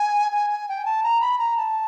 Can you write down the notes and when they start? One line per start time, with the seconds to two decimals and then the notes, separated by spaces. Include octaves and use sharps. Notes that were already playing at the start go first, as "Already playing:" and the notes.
Already playing: G#5
0.32 G#5
0.50 G#5
0.69 G5
0.85 A5
1.03 A#5
1.21 B5
1.38 A#5
1.57 A5